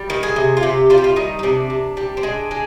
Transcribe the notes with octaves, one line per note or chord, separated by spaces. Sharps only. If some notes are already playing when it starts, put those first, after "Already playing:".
Already playing: G3
D#3
G#4
C3
F4
C3 G4
G3 F4
G4
F4
D#3 D#4
D#4
C3 D4
C3
G3
C4
G#3 D4
G#3